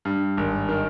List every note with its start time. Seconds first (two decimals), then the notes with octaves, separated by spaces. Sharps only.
0.05 G2
0.37 G#1
0.69 D#3